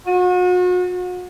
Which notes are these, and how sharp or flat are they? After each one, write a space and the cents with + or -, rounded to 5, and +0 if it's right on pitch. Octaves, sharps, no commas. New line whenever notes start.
F#4 -40